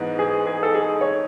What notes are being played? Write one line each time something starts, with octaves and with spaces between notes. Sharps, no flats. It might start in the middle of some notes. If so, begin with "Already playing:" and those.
Already playing: G#2 E3 G#3 B3 D#4
G#4
G#4
A4
G#4
C#5